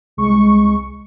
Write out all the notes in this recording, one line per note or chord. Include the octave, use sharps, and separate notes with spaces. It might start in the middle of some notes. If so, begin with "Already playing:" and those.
C2 G#3 C#6